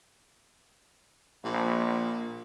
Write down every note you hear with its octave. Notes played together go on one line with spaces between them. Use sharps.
A#1 A#2